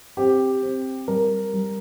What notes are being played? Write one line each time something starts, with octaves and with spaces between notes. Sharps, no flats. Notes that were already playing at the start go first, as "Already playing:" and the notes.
C4 G4
C4
G3 A#4
G3